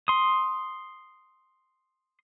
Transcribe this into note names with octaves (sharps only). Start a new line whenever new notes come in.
C6 D#6